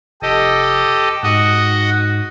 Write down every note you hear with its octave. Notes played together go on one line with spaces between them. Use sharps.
F1 G4 A4 D#5
G#2 F#4 D#5 F#5